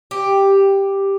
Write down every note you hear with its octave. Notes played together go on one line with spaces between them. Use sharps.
G4